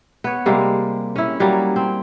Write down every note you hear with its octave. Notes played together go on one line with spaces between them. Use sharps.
B3 C#5
C3 G3 G#3 A#3
C#4 E4
F#3 G3 A#3 C#4
C4